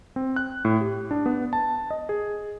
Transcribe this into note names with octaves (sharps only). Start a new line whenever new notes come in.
C4
F#6
A2
G4
D4
B3
A5
D#5
G#4